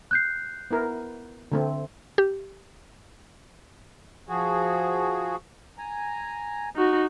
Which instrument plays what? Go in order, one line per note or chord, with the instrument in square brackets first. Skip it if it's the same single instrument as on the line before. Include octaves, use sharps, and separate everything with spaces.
[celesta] F#6 G6 C7
[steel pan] B3 E4 A#4
D3 A3 C4
[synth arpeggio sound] G4
[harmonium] F3 F#4 G#4
G#5 A#5
[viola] D#4 F#4